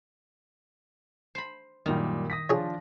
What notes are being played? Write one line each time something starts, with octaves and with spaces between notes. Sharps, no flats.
C5 B5
F#2 A#2 D#3 G3
D#6 A#6 B6
F3 D4 F4 G#4 C#5